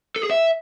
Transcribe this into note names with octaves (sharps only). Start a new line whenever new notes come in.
A4
G#4
E5